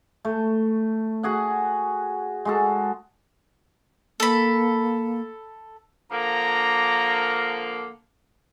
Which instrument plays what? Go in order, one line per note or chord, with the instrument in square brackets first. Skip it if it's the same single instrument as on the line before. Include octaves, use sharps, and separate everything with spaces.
[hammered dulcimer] A3
F#4 G#4 F#5
G#3 F#4 A4
[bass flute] A#3 [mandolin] A4 B5
[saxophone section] D3 F3 A#3 [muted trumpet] A#5